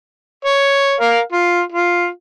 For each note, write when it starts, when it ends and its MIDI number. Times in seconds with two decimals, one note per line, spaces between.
0.45 0.94 73
1.00 1.21 70
1.00 1.21 77
1.32 1.62 65
1.72 2.08 65